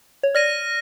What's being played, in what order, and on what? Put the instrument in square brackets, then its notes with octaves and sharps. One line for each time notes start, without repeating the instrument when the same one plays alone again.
[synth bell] C#5
[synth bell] D5 [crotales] F6 A#6 D#7